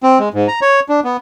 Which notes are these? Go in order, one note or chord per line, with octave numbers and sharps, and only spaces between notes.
C4
G#3
G#2
A#5
C#5
D4
B3